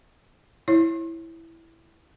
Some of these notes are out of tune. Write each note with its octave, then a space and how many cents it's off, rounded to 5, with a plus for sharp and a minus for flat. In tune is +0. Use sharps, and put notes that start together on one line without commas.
E4 +0 C#5 -25